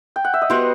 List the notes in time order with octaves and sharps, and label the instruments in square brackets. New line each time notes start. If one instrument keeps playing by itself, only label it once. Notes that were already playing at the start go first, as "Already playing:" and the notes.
[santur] G5
F#5
E5
D#5
[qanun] G3 B3 F#4 [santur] C5